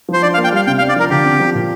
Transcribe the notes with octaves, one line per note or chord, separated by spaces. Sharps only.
F3 C5
D4 D5
F5
A#3
G5
G3 F5
C3 G5
F5
D4
D5
F3 A#4
D3 G4
C4
F3
A#2